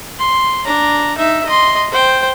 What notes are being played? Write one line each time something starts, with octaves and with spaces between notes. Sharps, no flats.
C6
D4 A#5
D#4 E5
D#5 C6
C5 G5